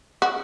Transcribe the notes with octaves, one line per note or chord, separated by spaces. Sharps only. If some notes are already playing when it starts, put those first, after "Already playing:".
F#4